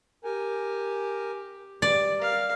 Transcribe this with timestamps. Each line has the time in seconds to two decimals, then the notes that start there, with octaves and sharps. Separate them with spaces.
0.25 G4 A#4 G#5
1.82 G3 D5
2.18 A#4 F5